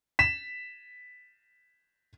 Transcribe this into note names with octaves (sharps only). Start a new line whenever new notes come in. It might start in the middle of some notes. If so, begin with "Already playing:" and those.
B6 E7